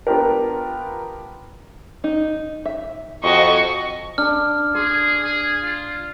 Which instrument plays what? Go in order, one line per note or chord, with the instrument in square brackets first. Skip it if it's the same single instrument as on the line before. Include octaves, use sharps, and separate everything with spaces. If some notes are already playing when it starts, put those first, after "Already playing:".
[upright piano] B3 D4 F4 G4 A#4
[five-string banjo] D#4
E5
[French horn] F2 [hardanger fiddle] F#4 D#5 [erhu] C#6
[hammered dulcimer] D4 [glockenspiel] F6
[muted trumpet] G#4 [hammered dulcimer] C6
[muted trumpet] G#4
F4